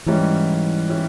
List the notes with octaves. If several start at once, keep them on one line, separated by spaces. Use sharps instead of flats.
G#2 E3 G3 C#4 E4
G3 C#4 E4